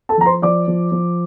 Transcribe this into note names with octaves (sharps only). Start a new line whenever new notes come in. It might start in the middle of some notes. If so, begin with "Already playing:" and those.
A4 A5
F3 A#5
C5 C6
F3 D5 D6
F3
F3